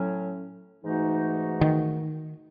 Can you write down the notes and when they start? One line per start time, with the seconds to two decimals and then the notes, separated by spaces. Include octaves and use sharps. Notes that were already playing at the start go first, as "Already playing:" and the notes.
Already playing: A2 F#3 C#4
0.83 G#2 E3 A3 D#4 F#4
1.61 D#3